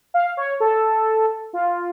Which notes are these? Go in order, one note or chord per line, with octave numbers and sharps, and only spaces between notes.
F5
C#5
A4
F4